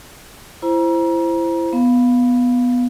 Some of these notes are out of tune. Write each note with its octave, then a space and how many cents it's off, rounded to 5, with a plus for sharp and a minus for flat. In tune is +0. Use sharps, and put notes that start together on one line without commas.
E4 +30 C5 +0 A#5 +30
B3 +0 F5 +0